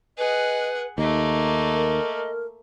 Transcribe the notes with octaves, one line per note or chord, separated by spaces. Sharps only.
G#4 B4 D#5 F#5
D#2 A3 A#3 D#4 D#5
A#4